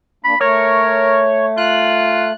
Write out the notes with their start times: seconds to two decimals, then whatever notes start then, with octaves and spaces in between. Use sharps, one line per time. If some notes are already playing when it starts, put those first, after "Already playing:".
0.25 A#3 D4 B5
0.40 A3 A#4 C#5
1.57 F4 F#6